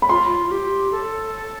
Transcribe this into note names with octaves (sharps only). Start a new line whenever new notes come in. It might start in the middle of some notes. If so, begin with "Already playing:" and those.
B5
F4 C6
F4
G4
A4